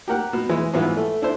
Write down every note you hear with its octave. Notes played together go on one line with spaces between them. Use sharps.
G4 A#4 F#5
B2
E3 G#3
G#2 B2 E3 B3 E4 F4
A3
D4 E4 A4 C5